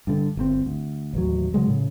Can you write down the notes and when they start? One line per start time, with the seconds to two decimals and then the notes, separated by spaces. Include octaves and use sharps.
0.07 G2 D3
0.37 G1 C3 C4
0.66 D2
1.13 A1 D#2 F#3
1.54 C#3 F#3 G#3
1.67 A2 C#3